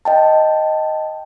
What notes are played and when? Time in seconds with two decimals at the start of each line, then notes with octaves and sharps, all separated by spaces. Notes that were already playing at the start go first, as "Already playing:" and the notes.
0.05 D#5 G5 A5